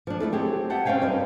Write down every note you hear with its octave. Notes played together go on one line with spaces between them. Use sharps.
F3 D4
A3 A#3 E4 A4
F#3 C4 G4 G#4
E5 F#5 G5 A5
C4 C#4 C#5 F5 G5 G#5
F#2 G3 B3 C4 D4 D#4